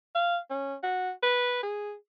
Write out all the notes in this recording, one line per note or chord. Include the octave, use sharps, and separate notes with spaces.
F5
C#4
F#4
B4
G#4